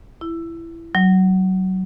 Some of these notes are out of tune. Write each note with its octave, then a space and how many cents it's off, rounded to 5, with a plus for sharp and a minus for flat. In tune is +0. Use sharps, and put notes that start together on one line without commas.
E4 +15
F#3 +20